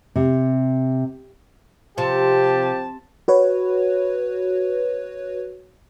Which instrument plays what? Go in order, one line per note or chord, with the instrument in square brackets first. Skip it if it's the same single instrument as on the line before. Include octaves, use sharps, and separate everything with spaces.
[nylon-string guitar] C3
[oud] C3 [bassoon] F3 [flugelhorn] G4 [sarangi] A5
[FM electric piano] F#4 B4 C#5